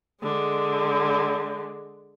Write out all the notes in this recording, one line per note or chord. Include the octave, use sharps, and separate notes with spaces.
D3 G#3